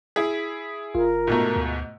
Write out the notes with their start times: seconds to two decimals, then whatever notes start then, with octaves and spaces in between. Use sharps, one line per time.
0.16 E4 G#4 B6
0.95 G1 F4 A#4
1.27 G#2 B2 A3
1.56 D2